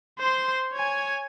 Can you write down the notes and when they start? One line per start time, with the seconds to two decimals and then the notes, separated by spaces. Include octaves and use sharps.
0.19 C5 C6
0.74 C#5 G#5